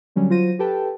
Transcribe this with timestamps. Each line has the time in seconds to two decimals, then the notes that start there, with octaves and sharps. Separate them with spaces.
0.16 D3 F#3 G3 C#4
0.30 F#3 F4 C5 A#6 D#7
0.59 G4 A4 B4 G5 A5